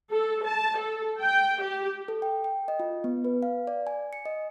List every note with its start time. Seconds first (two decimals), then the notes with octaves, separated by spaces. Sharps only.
0.12 A4
0.46 A5
0.79 A4
1.21 G5
1.61 G4
2.08 A4
2.22 G5
2.44 G5
2.68 D#5
2.80 F4
3.04 B3
3.24 B4
3.43 F5
3.67 D5
3.87 G#5
4.13 C#7
4.26 D#5